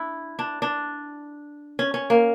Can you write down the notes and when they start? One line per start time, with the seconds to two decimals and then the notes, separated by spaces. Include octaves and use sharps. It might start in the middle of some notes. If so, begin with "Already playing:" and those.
Already playing: D4 E4
0.39 D4
0.62 D4
1.79 C#4
1.94 C#4
2.10 A#3